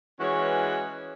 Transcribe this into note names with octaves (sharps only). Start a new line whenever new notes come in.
E3 G#3 C#4 F#4 B4 C#5